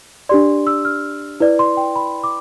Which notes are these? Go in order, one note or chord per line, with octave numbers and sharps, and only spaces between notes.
D4 G4 D5 C6
E6
F6
E4 B4 D5
C6
G5
B5
D6